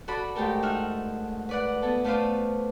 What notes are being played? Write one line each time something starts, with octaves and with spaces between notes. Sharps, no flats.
F#4 A4 D5 B5
G#2 A3 G4 A4 A#4
D#4 E5 F#5 F6
B4 D5 F#5
B3 E4 A4
A3 F4 B4 C5 D5 F5